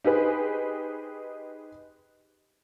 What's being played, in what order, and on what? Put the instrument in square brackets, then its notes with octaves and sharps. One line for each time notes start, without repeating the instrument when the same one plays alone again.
[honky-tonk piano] D#4 G4 G#4 B4 C5